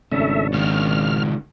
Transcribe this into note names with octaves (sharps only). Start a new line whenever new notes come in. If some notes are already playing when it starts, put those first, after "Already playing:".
G#1 C#3 A3 C#4 D4 E5
C#2 D#3 F6